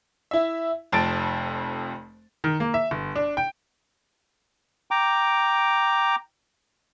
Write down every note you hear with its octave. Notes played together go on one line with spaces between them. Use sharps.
E4 E5
F1 F2 A5 A6 D7
D#3
A#3
E5
G1
D4
G5
G5 A#5 D6